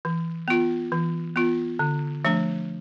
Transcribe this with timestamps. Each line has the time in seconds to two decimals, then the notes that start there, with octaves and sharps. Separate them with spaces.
0.05 E3
0.48 B3 F4
0.92 E3
1.36 B3 F4
1.79 D3
2.25 F3 A3 D4